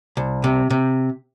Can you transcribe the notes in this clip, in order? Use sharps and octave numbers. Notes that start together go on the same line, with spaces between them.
C2
C3
C3